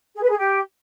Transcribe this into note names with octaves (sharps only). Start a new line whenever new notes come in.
G#4
B4
G#4
G4